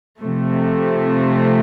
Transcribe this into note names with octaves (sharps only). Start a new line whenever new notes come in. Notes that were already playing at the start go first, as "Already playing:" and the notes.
C3 F3 A3